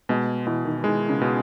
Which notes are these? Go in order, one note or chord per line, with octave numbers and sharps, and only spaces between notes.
B2 G#3
B2 E3
D#3
D#3 G#3
C#3
B2